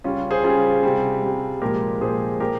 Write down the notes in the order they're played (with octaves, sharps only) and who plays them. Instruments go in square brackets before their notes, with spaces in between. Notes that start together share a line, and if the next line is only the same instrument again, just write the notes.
[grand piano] C#3 G3 C#4 F4
G#4 C5
C#3 G3 F4 G#4
C3 G3
C3 G3
A#2 F3 G#3 G4 A#4
A#2 F3 G#3 G#4 C5
A#2 G4 A#4